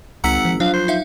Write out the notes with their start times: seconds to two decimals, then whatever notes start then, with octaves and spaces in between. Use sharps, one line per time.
0.24 G#1 C#2 F#5 A#5 E6 B6
0.45 F3
0.60 F3 F#3 D4 F5
0.73 C5
0.88 D#4 E5 F5